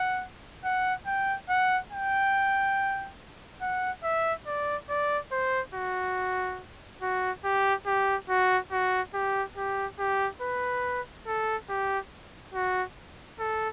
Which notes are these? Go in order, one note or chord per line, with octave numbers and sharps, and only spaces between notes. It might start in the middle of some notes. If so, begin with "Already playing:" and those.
Already playing: F#5
F#5
G5
F#5
G5
F#5
E5
D5
D5
C5
F#4
F#4
G4
G4
F#4
F#4
G4
G4
G4
B4
A4
G4
F#4
A4